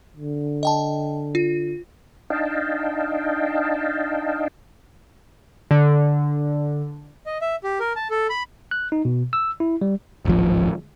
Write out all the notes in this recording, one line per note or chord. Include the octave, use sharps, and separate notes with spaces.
D3
D#5 G5 A5
F4
D4 D#4 D#5 F5 G5 A5
D3
D#5
E5
G4
A#4
A5
A4
B5
F#6
D#4
B2
E6
E4
G3
D1 G#1 F3